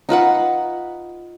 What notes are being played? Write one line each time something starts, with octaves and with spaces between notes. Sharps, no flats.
D#4 F4 B4 F#5